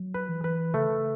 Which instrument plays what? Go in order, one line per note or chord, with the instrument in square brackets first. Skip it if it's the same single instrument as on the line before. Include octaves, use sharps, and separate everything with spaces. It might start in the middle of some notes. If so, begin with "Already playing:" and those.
Already playing: [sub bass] F#3
[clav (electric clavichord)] B4
[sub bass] E3
[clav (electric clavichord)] B4
[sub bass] C#3 [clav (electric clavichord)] A3